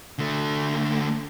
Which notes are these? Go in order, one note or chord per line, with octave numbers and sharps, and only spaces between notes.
D3 A3